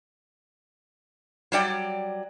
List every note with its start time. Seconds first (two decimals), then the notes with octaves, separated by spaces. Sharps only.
1.52 F#3 G3 D5 G5